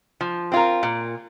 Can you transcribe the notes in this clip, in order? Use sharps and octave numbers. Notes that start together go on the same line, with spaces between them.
F3
C4 F4 A#4
A#2